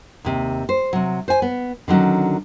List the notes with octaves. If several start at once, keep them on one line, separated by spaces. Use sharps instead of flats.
D#2 C3
C5
C3 F#3
C5 G#5
B3
D3 D#3 F#3 C#4